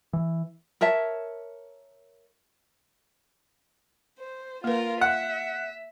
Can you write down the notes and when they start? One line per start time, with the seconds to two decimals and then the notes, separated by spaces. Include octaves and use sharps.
0.13 E3
0.81 A#4 C#5 E5 A5
4.20 C5
4.64 A#3 F4 A#4 B4
5.01 E5 F#5